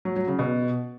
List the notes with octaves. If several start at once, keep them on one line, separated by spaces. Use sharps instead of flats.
F#3
F#3
C#3
B2